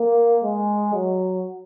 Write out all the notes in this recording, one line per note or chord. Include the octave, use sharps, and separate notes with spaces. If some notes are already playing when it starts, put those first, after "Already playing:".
Already playing: A#3
G#3
F#3